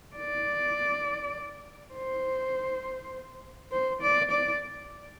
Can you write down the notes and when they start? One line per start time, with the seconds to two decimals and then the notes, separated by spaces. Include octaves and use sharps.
0.16 D5
1.94 C5
3.72 C5
4.01 D5
4.31 D5